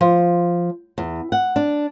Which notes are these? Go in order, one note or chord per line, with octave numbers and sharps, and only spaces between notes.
F3
E2
F#5
D4